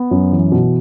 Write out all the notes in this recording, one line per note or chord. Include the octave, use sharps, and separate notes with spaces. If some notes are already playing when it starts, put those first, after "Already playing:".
Already playing: B3
F#2
E3
B2